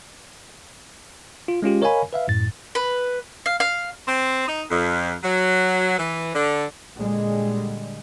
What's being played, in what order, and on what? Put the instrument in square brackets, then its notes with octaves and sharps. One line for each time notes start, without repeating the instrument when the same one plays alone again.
[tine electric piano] F4
G#3 C#4 F4 G4
A#4 C#5 D#5 F5 G#5 B5
B4 E5 F5
F#2 A2 A6
[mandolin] B4
F5
F5
[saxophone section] C4
D#4
F2
F#3
E3
D3
[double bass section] A#2 D3 G3 G#3